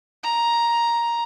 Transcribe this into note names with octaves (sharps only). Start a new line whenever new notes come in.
A#5